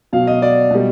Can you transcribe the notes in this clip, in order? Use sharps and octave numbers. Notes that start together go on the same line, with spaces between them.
B2 F#3 F5
D#5
D5
B2 G3